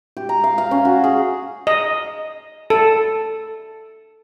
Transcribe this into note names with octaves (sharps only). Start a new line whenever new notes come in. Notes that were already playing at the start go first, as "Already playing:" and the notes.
G4
A#5
F5
F5
C#4
F#4
G#4
D#5
A4